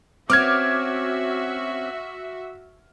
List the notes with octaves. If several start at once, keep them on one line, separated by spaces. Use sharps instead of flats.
C4 C#4 F#4 E5 D6 F6 G#6